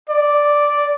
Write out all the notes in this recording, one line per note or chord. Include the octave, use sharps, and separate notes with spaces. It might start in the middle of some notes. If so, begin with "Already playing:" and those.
D5